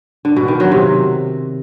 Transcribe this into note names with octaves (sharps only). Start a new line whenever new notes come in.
D3
B2
D#3
F#3
C3